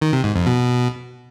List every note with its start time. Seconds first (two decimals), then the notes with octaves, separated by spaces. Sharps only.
0.02 D#3
0.13 C3
0.24 G#2
0.35 F2
0.47 B2